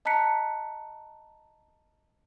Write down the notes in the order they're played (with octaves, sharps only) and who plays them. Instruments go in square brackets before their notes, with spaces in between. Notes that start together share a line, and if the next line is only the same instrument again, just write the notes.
[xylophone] D#5 A5 A#5 F#6 B6 C#7